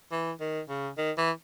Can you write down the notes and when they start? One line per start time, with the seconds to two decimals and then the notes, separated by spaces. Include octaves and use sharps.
0.12 E3
0.40 D#3
0.69 C#3
0.97 D#3
1.17 E3